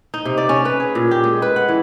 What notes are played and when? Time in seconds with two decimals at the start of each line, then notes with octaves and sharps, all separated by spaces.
0.14 D#4
0.25 C3
0.38 D5
0.49 C#4
0.65 B4
0.80 G#4
0.95 A#2
1.11 G4
1.24 G#3
1.42 B4
1.56 F#5
1.69 E3